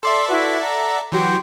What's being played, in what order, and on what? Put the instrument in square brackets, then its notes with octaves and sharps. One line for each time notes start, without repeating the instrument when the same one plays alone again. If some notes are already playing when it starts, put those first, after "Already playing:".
[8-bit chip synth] A4 D5 E5 [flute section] C6
[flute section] E4 F#4 B4
F#5 A#5
[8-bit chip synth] E3 F#3 F#4 [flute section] G4 C6 G6